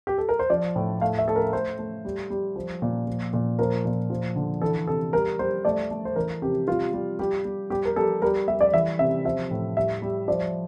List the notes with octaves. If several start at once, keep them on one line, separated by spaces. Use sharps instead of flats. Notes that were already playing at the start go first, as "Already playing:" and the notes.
G4
A4
A#4
C5
F3 D5
A2
A3 F5
E5
A3 A4
A#4
A3 C5
A3
G3
G3
F3
A#2
F3
A#2
F3 A#4
A#2
F3
D3
E3 A4
C3 A4
G3 A#4
G3 C5
A3 D5
A3
C5
E3 A#4
C3 G4
G3 F4
G3
G3 G4
G3
G3 G4
A#4
G3 A4
G3 A#4
G3 E5
D5
E3 E5
C3 E5
F3 E5
A2
G3 E5
G3
F3 D5